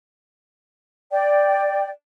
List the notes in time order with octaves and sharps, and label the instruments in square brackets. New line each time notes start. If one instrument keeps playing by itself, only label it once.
[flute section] D5 G5